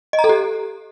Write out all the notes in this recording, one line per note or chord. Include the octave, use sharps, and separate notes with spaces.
D#5
A#5
A4
G4